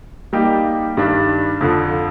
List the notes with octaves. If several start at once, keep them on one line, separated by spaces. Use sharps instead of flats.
G3 A#3 D#4 G4
G2 D#3 G3 D4
F2 D3 F3